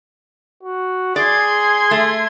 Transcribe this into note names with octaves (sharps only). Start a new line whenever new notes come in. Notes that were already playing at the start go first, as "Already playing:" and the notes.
F#4
G#4 D5 C6 G#6
A3